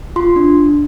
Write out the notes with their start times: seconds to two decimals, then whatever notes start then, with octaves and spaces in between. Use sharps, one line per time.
0.16 F4 C6
0.36 D4